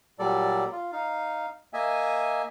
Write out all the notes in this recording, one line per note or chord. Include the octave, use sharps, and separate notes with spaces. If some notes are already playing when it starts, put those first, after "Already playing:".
A#2 F#3 G3 A4 D5
F4
D#4 F5
A#3 D#5 E5 G#5